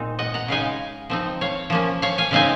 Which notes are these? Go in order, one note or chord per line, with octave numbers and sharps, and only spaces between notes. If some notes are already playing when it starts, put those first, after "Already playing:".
Already playing: A#2 G#3 C4 D#4
D#5 F#5
F#5 A#5
C#3 G#3 D#4 F5 G#5
F3 C4 D#4
C#5 F5
F3 A#3 C#4
C#5 F5
F5 G#5
C#3 G#3 C4 D#4 F5 G#5